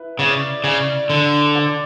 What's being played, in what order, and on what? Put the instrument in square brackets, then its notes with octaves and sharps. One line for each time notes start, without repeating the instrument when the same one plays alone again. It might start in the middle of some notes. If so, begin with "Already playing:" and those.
Already playing: [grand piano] E4 B4
[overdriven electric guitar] C#3 [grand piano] D5
[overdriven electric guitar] C#3 [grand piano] D5
[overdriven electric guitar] D3
[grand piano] D5